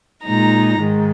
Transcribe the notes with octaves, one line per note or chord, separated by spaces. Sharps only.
A#2 G#3 D#4 A#5
G#2 D#3 G#3